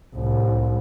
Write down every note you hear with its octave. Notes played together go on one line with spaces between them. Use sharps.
C2 A2